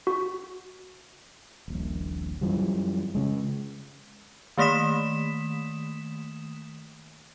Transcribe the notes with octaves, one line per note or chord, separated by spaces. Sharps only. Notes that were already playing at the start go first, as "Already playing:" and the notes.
F#4
D#1 A#1
F#2 E3 F3 G3
C#3 G#3
D#3 A3 A#3 D#6 B6 E7